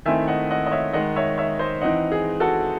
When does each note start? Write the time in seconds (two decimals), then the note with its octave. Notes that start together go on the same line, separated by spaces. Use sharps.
0.05 D#3 A3 C4 E4 E5 G#5
0.27 D#5 F#5
0.51 D#5 F#5
0.66 D#5
0.71 C#5 E5
0.93 D#3 G#3 D#4 D#5 F#5
1.16 C#5 E5
1.38 C#5 E5
1.59 C5 D#5
1.81 E3 C4 D#4 D#5 F#5
2.12 G#4
2.40 F#4 A4